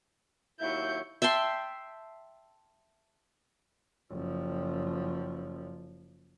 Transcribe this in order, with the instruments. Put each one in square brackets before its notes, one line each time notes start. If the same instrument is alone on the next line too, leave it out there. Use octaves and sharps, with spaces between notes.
[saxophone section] D#2 F#3 E4 [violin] C#6 G6
[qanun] E5 G5 A5 C6
[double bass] F#1 F3